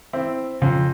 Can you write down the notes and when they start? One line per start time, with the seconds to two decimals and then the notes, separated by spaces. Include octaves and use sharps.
0.13 C4 E4
0.62 F2 C#3 C#4 C5